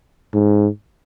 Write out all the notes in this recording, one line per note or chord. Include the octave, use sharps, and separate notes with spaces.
G#2